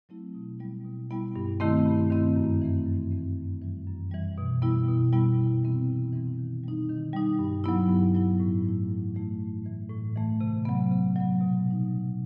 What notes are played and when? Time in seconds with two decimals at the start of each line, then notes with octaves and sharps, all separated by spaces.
0.09 F#3 A3 C4 E4
0.35 B2
0.59 G3 B3 E4
0.85 B2
1.11 G3 B3 E4
1.36 G2
1.60 D#3 A3 C4 E4
1.86 G2
2.10 D#3 A3 C4 E4
2.36 F#2
2.62 E3 A3 C4
2.86 F#2
3.11 E3 A3 C4
3.36 F#2
3.61 E3 G3
3.87 F#2
4.11 E3 G3
4.38 B2
4.62 G3 B3 E4
4.88 B2
5.13 G3 B3 E4
5.38 C3
5.63 E3 G3 C4 E4
5.88 C3
6.13 E3 G3 C4 E4
6.38 D#3
6.64 G3 D#4
6.89 D#3
7.13 G3 D#4
7.39 G2
7.64 F#3 B3 E4
7.90 G2
8.14 F#3 B3 E4
8.40 A2
8.65 E3 A3 E4
8.89 A2
9.15 E3 A3 E4
9.41 A2
9.66 E3 A3
9.90 A2
10.16 E3 A3
10.41 C3
10.65 F#3 B3
10.91 C3
11.16 F#3 B3
11.41 B2
11.67 G3 D#4
11.92 B2